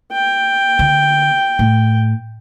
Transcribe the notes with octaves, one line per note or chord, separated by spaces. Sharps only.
G5
D3
A2